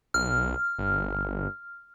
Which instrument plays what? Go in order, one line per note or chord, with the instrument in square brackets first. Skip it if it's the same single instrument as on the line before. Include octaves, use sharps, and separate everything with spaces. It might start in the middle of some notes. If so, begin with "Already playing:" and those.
[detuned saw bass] B1 [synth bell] F6
[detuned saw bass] G1